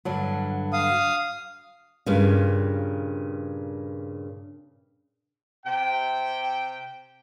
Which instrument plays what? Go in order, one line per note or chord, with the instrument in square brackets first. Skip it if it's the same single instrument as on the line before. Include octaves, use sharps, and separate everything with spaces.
[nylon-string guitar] G2 D3 F#3
[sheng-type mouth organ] F5 D#6
[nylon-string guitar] G2 A#2 C#3
[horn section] C3 G5